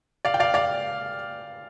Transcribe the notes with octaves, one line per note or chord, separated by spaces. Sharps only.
D5 F5
G5
D5 F5
D5 F5